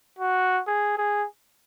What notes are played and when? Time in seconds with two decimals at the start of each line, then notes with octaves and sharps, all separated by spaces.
0.19 F#4
0.67 G#4
0.97 G#4